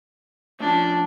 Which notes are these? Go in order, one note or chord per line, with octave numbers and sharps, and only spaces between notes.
A2 F3 C#4 D4